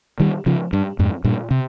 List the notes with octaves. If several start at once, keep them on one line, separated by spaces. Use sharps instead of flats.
D#3 G3
C#3 F3
G2
F2 G#2
G2 A#2
C3